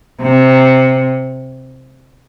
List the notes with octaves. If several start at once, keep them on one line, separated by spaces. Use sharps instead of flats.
C3